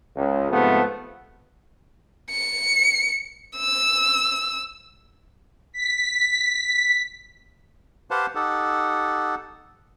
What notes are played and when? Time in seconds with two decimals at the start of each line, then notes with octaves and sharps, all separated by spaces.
0.16 C#2
0.51 G#2 C3 F3 A3 B3
2.31 C#7
3.58 E6
5.73 B6
8.11 G4 B4 C5 F5 F#5 A5
8.35 D#4 G4 A4 F#5